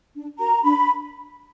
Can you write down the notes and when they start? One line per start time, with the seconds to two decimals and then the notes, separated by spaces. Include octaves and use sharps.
0.15 D4
0.39 F#4 A#4 A#5
0.63 D4 B5